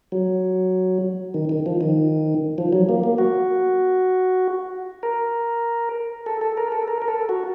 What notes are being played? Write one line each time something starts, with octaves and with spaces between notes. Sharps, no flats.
F#3
D#3
D#3
F3
D#3
F3
F#3
A#3
A#3
F#4
A#4
A4
A4
A#4
A4
A#4
A#4
A4
F#4